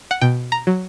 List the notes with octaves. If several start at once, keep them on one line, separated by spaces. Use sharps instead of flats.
F#5
B2 G5
A#5
F#3